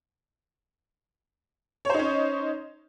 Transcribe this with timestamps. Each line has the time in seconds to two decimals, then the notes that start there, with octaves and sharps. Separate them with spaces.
1.85 C#5
1.90 C5
1.94 D#4
1.99 C#4